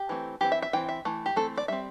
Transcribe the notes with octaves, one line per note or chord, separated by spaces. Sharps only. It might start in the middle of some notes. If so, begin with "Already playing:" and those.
Already playing: G4
E3 A3 C4
E3 C4 G4
E5
E5
E3 C4 G5
E5
E3 A3
G4
E3 A3 C4 A4
D5
G3 C4 E5